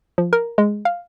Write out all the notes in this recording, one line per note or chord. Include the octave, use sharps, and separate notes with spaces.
F3
A#4
G#3
F5